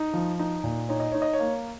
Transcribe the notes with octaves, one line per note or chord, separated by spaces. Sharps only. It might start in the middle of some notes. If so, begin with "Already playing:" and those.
Already playing: D#4
F3
D#4
A#2
D#4 C#5
D#5
D#4 C#5
D#5
C#5
A#3